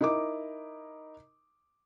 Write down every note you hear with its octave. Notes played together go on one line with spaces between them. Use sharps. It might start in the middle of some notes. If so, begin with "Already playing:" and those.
D#4 E4 A#4 D#5 D6